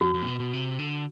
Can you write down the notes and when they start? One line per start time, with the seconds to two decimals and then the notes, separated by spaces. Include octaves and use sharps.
0.01 F2 F#4
0.14 F2
0.22 A#2
0.27 B2
0.40 B2
0.53 C3
0.79 D3